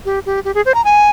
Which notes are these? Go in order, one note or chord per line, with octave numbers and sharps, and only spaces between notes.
G4
G4
G4
G#4
C5
A#5
G#5